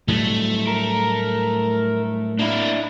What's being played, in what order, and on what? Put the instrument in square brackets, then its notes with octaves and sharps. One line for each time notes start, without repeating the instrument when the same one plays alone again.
[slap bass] A2 F#3 G3 [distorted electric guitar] A3
[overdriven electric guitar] A#4
[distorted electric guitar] A#3 [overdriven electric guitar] D4 E4